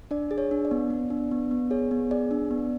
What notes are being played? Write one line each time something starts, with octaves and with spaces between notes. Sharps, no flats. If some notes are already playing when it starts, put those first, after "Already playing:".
D4 D5
G#4
C#5
D4
D5
B3
B3
D4
B3
B3
G#4 C#5
B3
G#4 D5
D4
B3